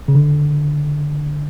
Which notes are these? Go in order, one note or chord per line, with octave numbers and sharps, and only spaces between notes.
C#3
D3